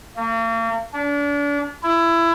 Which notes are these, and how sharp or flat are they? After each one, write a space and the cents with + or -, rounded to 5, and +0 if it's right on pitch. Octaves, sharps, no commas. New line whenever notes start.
A#3 -40
D4 -35
E4 +20